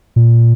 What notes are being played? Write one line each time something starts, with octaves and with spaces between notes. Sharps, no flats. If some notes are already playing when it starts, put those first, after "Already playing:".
A#2